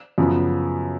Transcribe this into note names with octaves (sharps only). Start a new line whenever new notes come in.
F#2 C#3 F3 B3